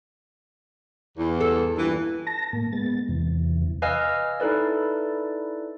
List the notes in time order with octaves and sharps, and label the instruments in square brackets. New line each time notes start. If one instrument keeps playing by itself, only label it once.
[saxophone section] E2
[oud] A4
[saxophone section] G2 A#2 E3
[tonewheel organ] A5 A#6
A2 A#3
G#3 B3 A6
E2 C3 E3
[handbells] B4 D#5 F5 G#5 E6 F6
D#4 E4 A4 B4 D5